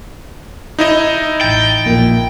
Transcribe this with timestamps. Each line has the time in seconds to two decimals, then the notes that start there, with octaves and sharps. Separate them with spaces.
0.79 D#4 E4 D#5
1.41 A1 G5 A6
1.86 A#1 A#2 A#3